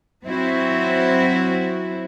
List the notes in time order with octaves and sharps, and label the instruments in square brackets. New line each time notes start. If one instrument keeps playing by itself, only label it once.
[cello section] F#3 C4 E4 F#4